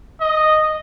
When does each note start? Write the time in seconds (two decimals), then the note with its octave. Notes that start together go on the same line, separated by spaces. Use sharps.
0.21 D#5